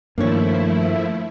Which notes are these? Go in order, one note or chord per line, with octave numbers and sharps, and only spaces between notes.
G2 D#3 F3 A3 A#3 D4 E4 C#5